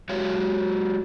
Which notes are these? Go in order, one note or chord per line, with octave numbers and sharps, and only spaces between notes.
F#3 G#3 F#4 G4 C#5 F5